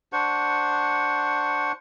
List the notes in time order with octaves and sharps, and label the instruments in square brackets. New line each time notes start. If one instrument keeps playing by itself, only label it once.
[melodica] D4 C5 F#5 C#6